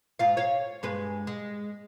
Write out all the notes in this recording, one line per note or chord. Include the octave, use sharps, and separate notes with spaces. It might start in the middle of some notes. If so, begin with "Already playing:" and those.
G#2 F4 F5
C#5 F5
G2 G#3 B4
G#3